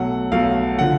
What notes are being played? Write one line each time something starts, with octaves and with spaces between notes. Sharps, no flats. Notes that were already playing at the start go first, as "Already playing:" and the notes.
Already playing: B1 B2 F#3 A3 F#5
B1 B2 F#3 A3 F5
D3 F3 F#5